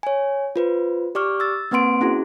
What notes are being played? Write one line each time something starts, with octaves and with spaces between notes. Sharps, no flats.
C#5 G#5
F4 B4 C5
G4 D5 C#6 D6 F6
E6 A6
A#3 C4 B4 F#5 C6 D7
C#4 E4 F#4 G#4